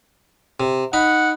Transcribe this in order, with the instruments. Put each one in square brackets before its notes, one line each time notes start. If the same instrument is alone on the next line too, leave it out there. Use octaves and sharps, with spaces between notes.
[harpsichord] C3
[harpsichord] D#4 B5 [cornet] F#5